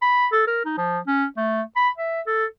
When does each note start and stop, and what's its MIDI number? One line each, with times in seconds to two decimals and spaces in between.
0.02 0.27 83
0.32 0.43 69
0.47 0.60 70
0.65 0.75 63
0.78 0.99 53
1.07 1.26 61
1.37 1.62 57
1.76 1.89 83
1.98 2.21 76
2.27 2.46 69